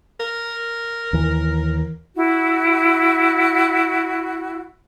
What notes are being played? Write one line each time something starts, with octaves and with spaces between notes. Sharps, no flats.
A#4
D#2 E3
E4 F#4